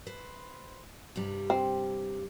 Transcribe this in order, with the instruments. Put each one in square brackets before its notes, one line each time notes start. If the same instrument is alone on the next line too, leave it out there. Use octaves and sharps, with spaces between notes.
[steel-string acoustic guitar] B4 C5
G2 C3 G3
[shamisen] C4